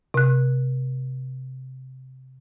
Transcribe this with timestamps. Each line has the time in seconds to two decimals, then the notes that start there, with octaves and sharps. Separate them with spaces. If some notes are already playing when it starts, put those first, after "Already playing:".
0.14 C3 F#6